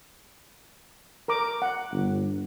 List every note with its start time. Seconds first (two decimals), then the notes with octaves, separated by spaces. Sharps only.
1.28 A#4 A#5 D6
1.62 F#5
1.93 G1